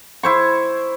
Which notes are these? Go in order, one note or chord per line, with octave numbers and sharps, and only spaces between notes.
E4 C5 C#6